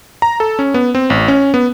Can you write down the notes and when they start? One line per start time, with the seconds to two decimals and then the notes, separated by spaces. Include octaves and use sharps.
0.22 A#5
0.40 A4
0.59 C#4
0.74 B3
0.95 C4
1.10 A1
1.28 C#4
1.54 B3